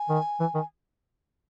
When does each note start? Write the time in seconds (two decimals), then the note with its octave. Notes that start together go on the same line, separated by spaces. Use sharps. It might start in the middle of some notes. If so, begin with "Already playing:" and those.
Already playing: G#5
0.09 D#3
0.40 E3
0.55 D#3